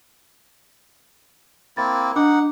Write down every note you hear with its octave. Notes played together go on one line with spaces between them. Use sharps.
A#3 C4 E4 A6
D4 D#4 F#5 D6